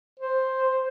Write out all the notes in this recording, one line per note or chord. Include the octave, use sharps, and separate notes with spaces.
C5